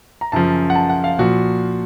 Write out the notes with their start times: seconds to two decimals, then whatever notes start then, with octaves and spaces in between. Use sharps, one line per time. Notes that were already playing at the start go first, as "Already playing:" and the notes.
0.21 A#5
0.32 F#2 C#3 F3 A5
0.70 F#5
0.75 A5
0.90 F#5
1.04 F5
1.19 A#2 F3 F#4